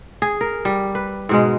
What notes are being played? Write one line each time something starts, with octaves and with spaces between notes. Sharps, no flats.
G#4
A#4
G3
B4
G#2 B2 G#3